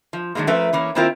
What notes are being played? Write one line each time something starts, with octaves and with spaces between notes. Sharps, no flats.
F3
D3 D#3 F#3 G#3 A#3
F3 A3 C#4 A#4 B4 E5
E3 A#3 C#4
D#3 A#3 C4 E4 F4 A#4